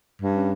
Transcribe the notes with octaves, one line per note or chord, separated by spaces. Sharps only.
G2
C#4